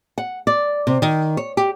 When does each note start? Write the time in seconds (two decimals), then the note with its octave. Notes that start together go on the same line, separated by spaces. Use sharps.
0.18 F#5
0.47 D5
0.87 C3
1.02 D#3
1.37 C#5
1.57 G4